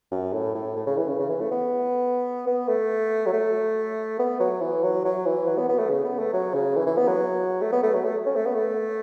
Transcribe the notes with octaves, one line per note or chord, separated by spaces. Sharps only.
F#2
A2
A2
A2
C#3
E3
C#3
C#3
E3
A3
B3
B3
A3
F#3
A3
B3
F#3
E3
F#3
F#3
E3
F#3
B3
B3
A3
C#3
B3
A3
F#3
C#3
E3
E3
B3
F#3
A3
B3
A3
F#3
A3
C#4
A3
B3
A3